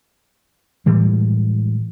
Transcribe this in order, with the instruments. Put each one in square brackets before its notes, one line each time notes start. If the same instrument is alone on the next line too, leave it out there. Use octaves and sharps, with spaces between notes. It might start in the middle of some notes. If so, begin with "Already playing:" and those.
[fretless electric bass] A2 E3 G3 G#3